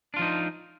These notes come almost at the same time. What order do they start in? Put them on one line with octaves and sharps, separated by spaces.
D4 F4 F3 D#4